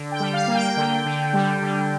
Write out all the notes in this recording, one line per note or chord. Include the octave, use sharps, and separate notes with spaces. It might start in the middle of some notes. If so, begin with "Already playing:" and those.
Already playing: D3
G5
G3
F5
A#3
G5
D3
D3
G3
D3